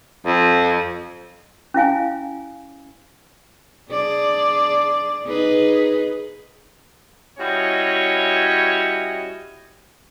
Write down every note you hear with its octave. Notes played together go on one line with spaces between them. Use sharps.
F2
C#4 E4 F5 G#5
D4 G#4 D5
D#4 G#4 B4
G3 C#4 E4 F#4 C#5 D#5